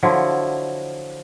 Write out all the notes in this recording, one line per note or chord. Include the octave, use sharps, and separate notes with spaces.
D3 F3 F#3 E4